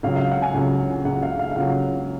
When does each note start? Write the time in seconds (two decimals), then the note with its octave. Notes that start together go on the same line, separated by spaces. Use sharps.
0.03 C#2 C#3 F#3 F5
0.16 F5
0.31 F#5
0.42 G#5
0.54 C#2 C#3 F#3
1.05 C#2 C#3 F#3 F#5
1.23 F5
1.39 F5
1.51 F5
1.56 C#2 C#3 F#3 F#5